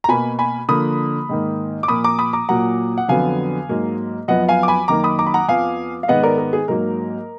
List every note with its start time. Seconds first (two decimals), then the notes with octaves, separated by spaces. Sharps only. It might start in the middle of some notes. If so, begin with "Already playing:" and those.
0.04 A#5
0.09 B2 A#3 G#5 B5
0.39 G#5 B5
0.69 D3 F3 A#3 B5 D#6
1.29 G#2 D#3 A#3
1.83 D6
1.88 A#2 F3 A#3 B5 D#6
2.04 A#5 D6
2.19 B5 D#6
2.33 A#5 D6
2.49 A#2 F#3 A#3 F#5 A#5
2.98 F#5
3.08 F2 D3 F#3 B3 F5 G#5
3.69 G#2 F#3 A#3
4.28 F#2 F3 B3 D#5 F#5
4.49 F5 G#5
4.63 D6
4.68 G#5 B5
4.88 F#2 D#3 A#3 A#5 D6
5.04 B5 D#6
5.19 A#5 D6
5.27 B5
5.34 F#5 A#5
5.48 F2 F3 B3 F5 G#5
6.03 F5
6.08 G#2 D#3 G#3 B3 D#5 F#5
6.23 A#4 D5
6.38 A#4
6.53 G#4
6.68 G#2 F#3 A#3 A#4